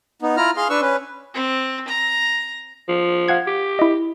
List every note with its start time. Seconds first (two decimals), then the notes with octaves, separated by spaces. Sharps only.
0.22 B3 D#4
0.37 E4 F4 A#5 F6
0.57 G#4 F5 C6 F6
0.70 D4 B4 C#6 E6
0.81 C#4 B4
1.34 C4
1.88 A#5
2.88 F3
3.28 F5 F#5 G#6
3.47 G4
3.79 E4 D#5